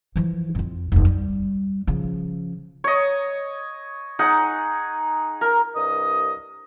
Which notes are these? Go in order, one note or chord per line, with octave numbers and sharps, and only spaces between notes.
E3 F3
F2 F4
F1 E2
G3
C#3 F3
C#5 D#5
D#4 G#4 F#5
A#4
C2 G2 D#5 D#6